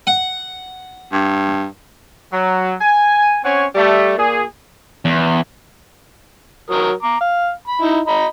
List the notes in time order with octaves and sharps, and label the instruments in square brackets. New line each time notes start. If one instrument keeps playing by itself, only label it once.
[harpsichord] F#5
[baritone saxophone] G2
[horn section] F#3
G#5
C4 C#4 C#5 F#5 G#5
G3 A3
A#2 G#4
[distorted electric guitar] E2
[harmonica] F#3 A#4 D#6
A#5 D6
F5
B5
D#4 E4
D#5 A#5 B5